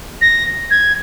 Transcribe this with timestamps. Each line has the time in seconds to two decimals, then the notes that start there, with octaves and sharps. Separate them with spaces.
0.21 A#6
0.71 G#6